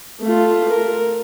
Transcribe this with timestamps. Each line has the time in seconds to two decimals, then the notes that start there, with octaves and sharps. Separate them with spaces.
0.21 A3 F4
0.69 A#4